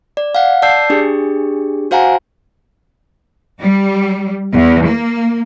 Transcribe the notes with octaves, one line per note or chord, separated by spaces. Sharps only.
D5
F5 F#5
D5 A5 E6 G6 C7
D4 G4 G#4
F#4 C5 F5 F#5 G#5 A#5
G3
E2
A#3